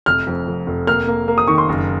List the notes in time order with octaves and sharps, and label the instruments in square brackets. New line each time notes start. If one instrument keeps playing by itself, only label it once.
[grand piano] F1 [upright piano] F6
[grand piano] F2
F1
F1
[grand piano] A#3 [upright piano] F6
[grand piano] A#3
A#3
[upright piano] D#6
[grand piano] D#3 [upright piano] C#6
[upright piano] C6
[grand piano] F#1